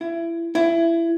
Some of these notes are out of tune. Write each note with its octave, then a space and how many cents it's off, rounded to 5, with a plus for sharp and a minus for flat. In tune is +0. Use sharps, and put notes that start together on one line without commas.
E4 +25
E4 +20